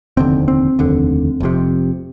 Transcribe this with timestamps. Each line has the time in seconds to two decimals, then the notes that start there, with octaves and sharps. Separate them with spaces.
0.17 F1 D#2 D3 C4
0.48 C4
0.79 F1 D#2 D3
1.40 F1 F2 C3